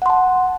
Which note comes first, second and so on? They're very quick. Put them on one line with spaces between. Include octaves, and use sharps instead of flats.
F#5 C6 A5